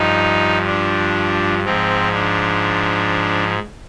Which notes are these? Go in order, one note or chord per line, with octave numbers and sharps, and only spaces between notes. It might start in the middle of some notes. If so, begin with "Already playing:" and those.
Already playing: G2 F3 D#4
D4
G#2 F3 C4
D4